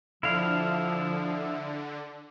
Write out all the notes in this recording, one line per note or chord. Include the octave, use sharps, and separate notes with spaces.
D3 F3 E4 F5